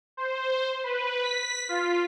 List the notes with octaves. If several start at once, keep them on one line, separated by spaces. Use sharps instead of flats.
C5
B4
B6
F4